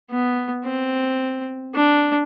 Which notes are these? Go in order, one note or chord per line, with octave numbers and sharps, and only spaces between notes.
B3
C4
D4